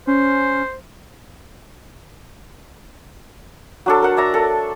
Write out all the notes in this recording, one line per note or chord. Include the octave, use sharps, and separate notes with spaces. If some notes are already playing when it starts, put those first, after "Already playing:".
C#4 C5
F#3 D4 A4
A#4 F#5
D5 E5 A#5
A4